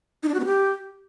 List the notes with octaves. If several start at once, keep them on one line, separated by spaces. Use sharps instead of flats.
D#4
D4
F#4
B3
G4